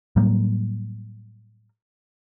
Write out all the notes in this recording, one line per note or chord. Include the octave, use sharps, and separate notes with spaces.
A2 F#3 G3 A#3